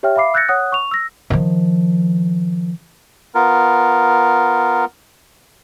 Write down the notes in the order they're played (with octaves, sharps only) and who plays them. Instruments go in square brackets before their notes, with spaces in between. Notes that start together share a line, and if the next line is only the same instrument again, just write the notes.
[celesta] G4 C#5 E5 G5 F6
E5 F5 B5 D6 C7
E6 F#6 G6 A6 A#6 C#7
C#5 F#5 D#6 F#6
C#6 F7
E6 A#6
[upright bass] D#3 F3
[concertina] B3 F4 A#4